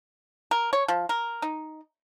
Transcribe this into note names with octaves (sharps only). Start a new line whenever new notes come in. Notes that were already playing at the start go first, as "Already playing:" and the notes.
A#4
C#5
F3
A#4
D#4